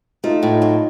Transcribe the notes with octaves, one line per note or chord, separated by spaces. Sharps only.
A3 D#4 F4
A2
D#4 F4
F#3